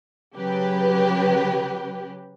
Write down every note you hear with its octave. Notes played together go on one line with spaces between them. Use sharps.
C#3 F#3 G4 B4